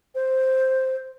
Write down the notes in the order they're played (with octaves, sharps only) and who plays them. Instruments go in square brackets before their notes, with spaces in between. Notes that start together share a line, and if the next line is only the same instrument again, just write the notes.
[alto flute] C5